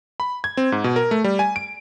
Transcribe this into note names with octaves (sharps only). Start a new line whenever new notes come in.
B5
G#6
C4
G#2
B2
A#4
A3
G3
G#5
D7